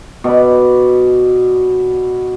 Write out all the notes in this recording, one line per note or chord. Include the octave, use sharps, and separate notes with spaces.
B2 D5 B5